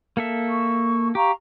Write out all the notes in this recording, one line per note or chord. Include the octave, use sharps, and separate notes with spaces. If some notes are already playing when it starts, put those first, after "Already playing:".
A#3 A4 E5
C#6
G4 F5 A#5 C#6